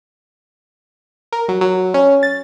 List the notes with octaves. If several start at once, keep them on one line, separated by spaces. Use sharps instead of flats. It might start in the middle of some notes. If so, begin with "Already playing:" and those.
A#4
F#3
F#3
C#4
A6